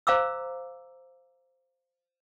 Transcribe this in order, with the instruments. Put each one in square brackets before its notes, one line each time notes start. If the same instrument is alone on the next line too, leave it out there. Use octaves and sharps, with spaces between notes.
[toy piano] C5 F5 A#5 D6 E6